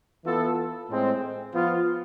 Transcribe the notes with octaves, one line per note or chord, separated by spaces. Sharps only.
E3 B3 F4 A4
A2 G#3 C4
F3 B3 F4